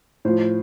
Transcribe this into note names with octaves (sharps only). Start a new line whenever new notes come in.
A2 F3 C5